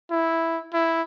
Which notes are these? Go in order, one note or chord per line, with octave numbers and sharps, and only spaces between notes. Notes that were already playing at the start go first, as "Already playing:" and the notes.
E4
E4